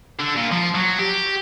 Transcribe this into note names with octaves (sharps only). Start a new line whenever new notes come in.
D3
A#2
F3
F#3
G4